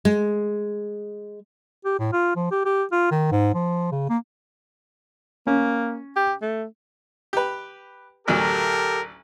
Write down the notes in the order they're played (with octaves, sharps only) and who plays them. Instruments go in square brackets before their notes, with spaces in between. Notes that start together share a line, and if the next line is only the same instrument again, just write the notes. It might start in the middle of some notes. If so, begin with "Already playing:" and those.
[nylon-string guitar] G#3
[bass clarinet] G4
A2
F4
F3
G4
G4
F4
D#3
G#2
F3
C#3
A#3
[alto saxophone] A#3 [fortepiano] C#4
[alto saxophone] G4
A3
[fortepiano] G4 B4
[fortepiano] A1 D2 F#3 [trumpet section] G4 A4 A#4